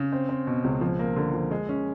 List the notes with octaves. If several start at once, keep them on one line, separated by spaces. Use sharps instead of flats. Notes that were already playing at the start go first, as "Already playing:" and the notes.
Already playing: C#3
C4
C4
B2
C#2
F3
A#3
D3
F3
G#3
C#4